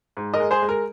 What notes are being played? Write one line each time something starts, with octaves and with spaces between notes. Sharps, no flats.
G#2
A#4 D#5
G#3
G#4 C5
G#3
A#4